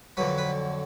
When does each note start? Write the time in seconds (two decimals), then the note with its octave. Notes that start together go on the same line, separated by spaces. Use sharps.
0.17 F2 D3 F#3 B4
0.38 B4